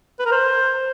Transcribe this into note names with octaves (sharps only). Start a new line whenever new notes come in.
B4
A#4
C5